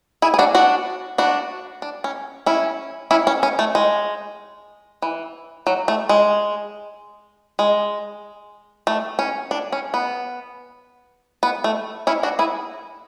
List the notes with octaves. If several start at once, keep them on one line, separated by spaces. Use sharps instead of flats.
E4 G#4
G#4
D4 F#4
D4 F#4
D4 F#4
D4
C#4
C#4 E4
C#4 E4
C#4
C#4
A3
G#3
E3
F#3
A3
G#3
G#3
A3
C#4
D4
C#4
B3
B3
A3
C#4 E4
D4 F#4
E4 G#4